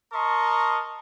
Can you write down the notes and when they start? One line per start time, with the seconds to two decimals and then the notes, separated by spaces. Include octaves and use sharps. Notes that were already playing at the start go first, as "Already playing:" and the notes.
0.13 A#4 D#5 A5 A#5 C6 C#6